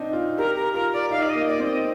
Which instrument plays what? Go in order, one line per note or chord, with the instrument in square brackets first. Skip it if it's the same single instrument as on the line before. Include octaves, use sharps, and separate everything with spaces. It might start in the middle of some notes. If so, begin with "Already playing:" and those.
Already playing: [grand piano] C4 D4 D#4
F4
[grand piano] G4 [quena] A#4
[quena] A#4
[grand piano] F4 [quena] A#4
[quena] D5
[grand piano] D#4 [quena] F5
[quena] D5
D#5
[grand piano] A#3
[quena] D5
[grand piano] C4
[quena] D#5